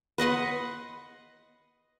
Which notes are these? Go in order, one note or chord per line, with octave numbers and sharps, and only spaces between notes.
B4 D#5 F#5 C6